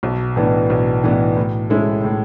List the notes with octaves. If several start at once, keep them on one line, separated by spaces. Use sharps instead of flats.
B1
A2 E3 B3 D4
B1
A2 E3 B3 D4
A2
G#3 C#4 E4 A4
A2